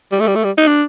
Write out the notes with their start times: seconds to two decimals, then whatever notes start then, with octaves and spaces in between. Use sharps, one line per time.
0.12 G3
0.20 A3
0.27 G3
0.35 A3
0.44 G3
0.58 D#4
0.67 D4